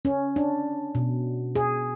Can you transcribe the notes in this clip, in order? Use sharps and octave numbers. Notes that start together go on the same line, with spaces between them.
C#4
D4
B2
G#4